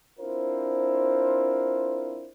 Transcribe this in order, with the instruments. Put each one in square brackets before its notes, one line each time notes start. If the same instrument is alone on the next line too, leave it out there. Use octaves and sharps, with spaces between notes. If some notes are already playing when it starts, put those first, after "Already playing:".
[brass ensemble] C4 D4 E4 F4 A#4 C5